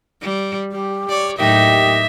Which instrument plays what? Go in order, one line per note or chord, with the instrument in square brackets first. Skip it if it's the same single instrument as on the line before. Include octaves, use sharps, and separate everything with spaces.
[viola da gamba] G3
[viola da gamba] G3 [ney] G4
[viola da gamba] C#5 D5
[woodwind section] D#2 G4 D#5 [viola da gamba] A2 F#3 D#4 [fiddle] E5 [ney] G5